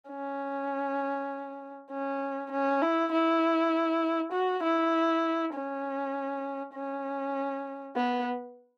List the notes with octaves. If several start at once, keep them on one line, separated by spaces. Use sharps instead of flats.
C#4
C#4
C#4
E4
E4
F#4
E4
C#4
C#4
B3